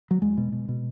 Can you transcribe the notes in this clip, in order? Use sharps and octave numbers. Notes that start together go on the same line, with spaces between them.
F#3
E2 G#3
B2
B2
B2